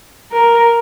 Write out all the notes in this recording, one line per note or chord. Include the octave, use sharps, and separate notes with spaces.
A#4